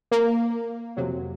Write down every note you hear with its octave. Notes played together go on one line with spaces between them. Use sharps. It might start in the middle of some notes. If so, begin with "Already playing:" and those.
A#3
F2 C3 F#3